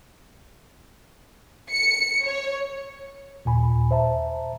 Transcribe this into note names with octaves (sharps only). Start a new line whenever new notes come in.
C#7
C#5
D#2 A#2 G#5 B5
C5 E5 A5 A#5